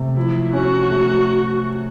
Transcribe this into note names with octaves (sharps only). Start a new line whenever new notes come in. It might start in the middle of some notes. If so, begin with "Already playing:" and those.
Already playing: C3 A3
F3 E4
C#4 F#4
A3